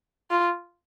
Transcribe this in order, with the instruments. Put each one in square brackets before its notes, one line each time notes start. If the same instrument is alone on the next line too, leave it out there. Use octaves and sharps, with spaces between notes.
[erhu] F4